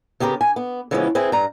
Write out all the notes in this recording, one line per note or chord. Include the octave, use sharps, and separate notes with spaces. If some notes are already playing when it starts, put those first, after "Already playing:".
C#3 B3 G4 A4 A#4
G#5
B3
C#3 E3 F3 G#3 B3 C#4
C4 E4 G#4 B4
G2 A#5